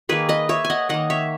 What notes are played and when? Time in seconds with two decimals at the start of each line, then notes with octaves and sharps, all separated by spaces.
0.09 D#3 A#3 G#4 B4
0.29 B4 D#5
0.49 C#5 E5
0.65 G#5
0.70 D#5 F#5
0.89 D#3 A#3 D#5 F#5
1.10 C#5 E5